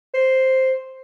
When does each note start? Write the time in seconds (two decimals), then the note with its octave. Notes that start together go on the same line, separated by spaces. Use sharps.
0.14 C5